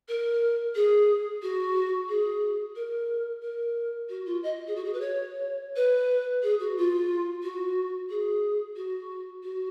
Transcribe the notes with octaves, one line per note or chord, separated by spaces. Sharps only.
A#4
G#4
F#4
G#4
A#4
A#4
F#4
F4
D#5
G#4
F#4
G#4
B4
C#5
B4
G#4
F#4
F4
F#4
G#4
F#4
F#4